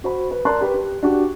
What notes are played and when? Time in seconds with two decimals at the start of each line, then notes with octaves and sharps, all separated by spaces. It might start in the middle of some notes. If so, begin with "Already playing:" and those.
0.04 F#4 C5 B5
0.31 B4
0.45 A#4 D5 A5 A#5 C6 F#6
0.61 G4 B4
0.74 G4
1.03 D4 F#4 G4